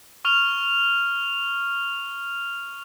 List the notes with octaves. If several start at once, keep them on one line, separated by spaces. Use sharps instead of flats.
C#6 F6 F7